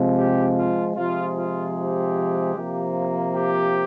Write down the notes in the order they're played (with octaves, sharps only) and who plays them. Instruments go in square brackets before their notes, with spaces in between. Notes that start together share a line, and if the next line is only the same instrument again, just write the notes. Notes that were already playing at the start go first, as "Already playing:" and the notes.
Already playing: [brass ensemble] C3 F3 G#3
G4
F4
C3 F3 G#3 F4
F4
G4
C3 F3 A#3
G4